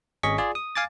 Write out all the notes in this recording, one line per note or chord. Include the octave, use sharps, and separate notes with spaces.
G#1 C#4 G#4 D#5 C#6 B6
F4 G#4 D5
D#6
F5 G#5 D6 A6